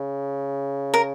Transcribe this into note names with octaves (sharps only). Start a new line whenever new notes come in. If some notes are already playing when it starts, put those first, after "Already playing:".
Already playing: C#3
A#4